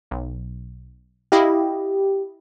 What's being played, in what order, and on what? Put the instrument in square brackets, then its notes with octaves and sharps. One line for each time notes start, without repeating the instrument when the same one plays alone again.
[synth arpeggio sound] B1
[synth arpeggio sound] E4 D#5 F5 [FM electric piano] G4